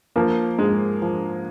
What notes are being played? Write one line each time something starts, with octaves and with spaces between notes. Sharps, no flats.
F3 A#3
G#2 G#3
F3